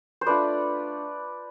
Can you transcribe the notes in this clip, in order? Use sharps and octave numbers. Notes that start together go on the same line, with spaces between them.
C5
A3 D4 F4 B4 D5